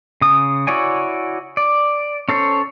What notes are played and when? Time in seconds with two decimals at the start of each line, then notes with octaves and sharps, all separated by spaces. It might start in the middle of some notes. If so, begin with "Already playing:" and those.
0.21 C#3 D#6
0.67 E4 F#4 C#5 D5 G#5
1.57 D5
2.29 C#4 A4 C5 C#5